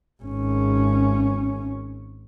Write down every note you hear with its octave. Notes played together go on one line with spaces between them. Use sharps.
G#1 C#4